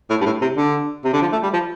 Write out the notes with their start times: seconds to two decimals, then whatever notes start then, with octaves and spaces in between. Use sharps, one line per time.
0.10 A2
0.21 G2
0.26 A2
0.42 C3
0.57 D3
1.05 C3
1.13 D3
1.22 F3
1.32 A3
1.43 G3
1.53 F3